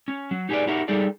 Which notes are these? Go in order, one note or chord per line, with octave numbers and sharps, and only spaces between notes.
C#4
F#3
D#4 G4 G#4 A#4 B4 D5
D#4 E4 F#4 G4 A#4
G3 D#4 G#4 A4 D5